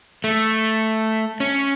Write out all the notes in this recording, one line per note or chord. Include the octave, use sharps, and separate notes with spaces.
A3
C#4